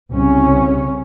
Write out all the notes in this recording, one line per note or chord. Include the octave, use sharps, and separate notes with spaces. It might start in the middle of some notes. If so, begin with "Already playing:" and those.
C2 C#3 C#4